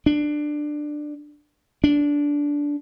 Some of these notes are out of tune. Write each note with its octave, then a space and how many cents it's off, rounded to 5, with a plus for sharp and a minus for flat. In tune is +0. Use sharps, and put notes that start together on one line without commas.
D4 +15
D4 -15